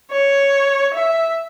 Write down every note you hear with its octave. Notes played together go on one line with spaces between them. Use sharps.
C#5
E5